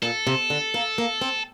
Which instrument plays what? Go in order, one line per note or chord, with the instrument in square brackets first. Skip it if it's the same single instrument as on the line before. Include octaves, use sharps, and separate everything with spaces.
[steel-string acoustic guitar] A#2 [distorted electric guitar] A4
[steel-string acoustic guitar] C3
D3
A#3
A#3
C4